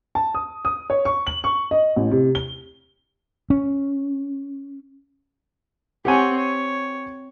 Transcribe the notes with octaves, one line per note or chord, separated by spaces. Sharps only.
A5
D#6
D#6
C#5
C#6
F#7
C#6
D#5
A1
C3
G7
C#4
C4 G4 C#5 F#5 G#5
C#5